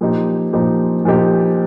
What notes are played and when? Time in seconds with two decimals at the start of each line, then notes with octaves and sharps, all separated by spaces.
0.01 A#2 F3 D#4 G4
0.53 A#2 F3 D#4 G4
1.05 A#2 F3 D#4 G4